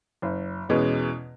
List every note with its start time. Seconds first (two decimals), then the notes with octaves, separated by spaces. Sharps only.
0.22 F#1
0.69 E2 B2 G#3 C#4